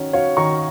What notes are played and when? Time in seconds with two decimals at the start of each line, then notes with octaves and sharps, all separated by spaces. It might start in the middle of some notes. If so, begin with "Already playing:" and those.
Already playing: D#3 C#4 F#4
0.13 F#4 C#5 F5
0.37 D#3 A#5 C#6